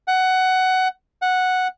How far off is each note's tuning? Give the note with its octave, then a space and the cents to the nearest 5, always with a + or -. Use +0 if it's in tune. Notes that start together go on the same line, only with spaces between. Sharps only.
F#5 +15
F#5 -5